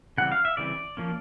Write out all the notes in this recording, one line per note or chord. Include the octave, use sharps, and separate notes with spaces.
C#3 E3 G3 C4 F#5
F5
E5
C#3 E3 G3 C4 D5
F3 A#3 C#4